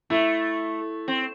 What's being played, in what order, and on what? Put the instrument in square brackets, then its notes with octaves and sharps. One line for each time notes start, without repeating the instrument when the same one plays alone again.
[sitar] A3 [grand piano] E4
[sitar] C4